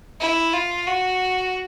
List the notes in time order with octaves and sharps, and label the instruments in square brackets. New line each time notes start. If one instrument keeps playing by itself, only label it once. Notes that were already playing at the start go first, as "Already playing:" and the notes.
[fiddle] E4
F4
F#4